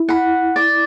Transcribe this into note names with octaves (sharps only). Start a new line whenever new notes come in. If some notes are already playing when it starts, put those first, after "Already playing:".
Already playing: E4
F#5 B5
D5